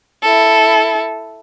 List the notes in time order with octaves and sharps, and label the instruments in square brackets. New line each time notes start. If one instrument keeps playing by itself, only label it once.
[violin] E4 A4